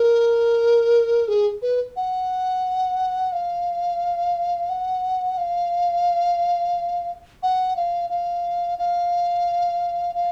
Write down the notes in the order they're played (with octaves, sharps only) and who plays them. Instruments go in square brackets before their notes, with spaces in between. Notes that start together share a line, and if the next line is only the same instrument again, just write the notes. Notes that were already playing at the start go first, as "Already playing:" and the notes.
Already playing: [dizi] A#4
G#4
B4
F#5
F5
F#5
F5
F#5
F5
F5
F5
F5